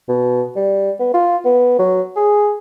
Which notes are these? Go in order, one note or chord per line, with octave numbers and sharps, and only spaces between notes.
B2
G3
B3
F4
B3
F#3
G#4